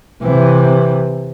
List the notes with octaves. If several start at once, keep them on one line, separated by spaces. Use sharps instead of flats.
C3 E3